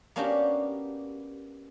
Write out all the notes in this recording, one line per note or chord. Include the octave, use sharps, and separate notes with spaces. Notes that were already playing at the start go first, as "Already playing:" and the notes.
A#3 B3 C#4 D4 F#4 G4